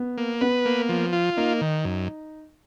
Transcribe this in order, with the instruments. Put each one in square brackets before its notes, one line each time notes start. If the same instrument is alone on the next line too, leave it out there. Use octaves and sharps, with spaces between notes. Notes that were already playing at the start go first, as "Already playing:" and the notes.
Already playing: [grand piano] B3
[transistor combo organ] A#3
[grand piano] B3 [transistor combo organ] B4
[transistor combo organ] A#3
F3
F4
[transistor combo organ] A#3 [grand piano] D#4
[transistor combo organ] D#3
F#2